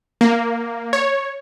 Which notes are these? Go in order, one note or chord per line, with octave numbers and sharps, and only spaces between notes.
A#3
C#5